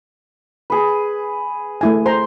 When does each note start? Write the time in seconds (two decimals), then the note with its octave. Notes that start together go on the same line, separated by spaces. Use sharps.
0.70 G#4 B4
1.81 A3 E4 G#5
2.06 C5 A#5 C6